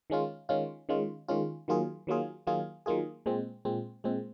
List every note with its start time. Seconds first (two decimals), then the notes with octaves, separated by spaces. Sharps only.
0.10 D#3 G#3 C#4 F4
0.49 D#3 G#3 C#4 F4
0.89 D#3 G#3 C#4 F4
1.28 D#3 G#3 C#4 F4
1.68 D#3 F#3 A#3 F4 G#4
2.07 D#3 F#3 A#3 F4 G#4
2.47 D#3 F#3 A#3 F4 G#4
2.86 D#3 F#3 A#3 F4 G#4
3.26 A#2 G#3 C4
3.65 A#2 G#3 C4
4.04 A#2 G#3 C4